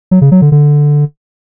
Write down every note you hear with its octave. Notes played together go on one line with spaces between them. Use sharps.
F#3
C#3
F#3
D3
D3